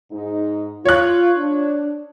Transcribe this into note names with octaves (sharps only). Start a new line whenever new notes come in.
G#2 D#4
F4 C#5 F#6
D4